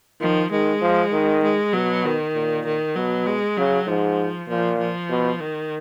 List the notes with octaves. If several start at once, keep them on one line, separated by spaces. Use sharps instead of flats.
D#3 F3
D#3 G#3
F3
D#3
G#3
B2 F#3
D#3
A#2
D#3
B2 F#3
G#3
C#3 F#3
G#2 F3
A#2 F3
F3
B2
D#3